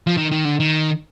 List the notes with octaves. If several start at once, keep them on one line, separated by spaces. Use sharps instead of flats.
F3
D#3
D#3
D3
D#3